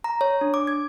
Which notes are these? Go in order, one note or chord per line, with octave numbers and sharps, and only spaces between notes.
A#5
C#5
D4
D6
G#6